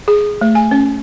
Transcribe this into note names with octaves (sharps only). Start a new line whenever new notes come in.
G#4
A3
G#5
C#4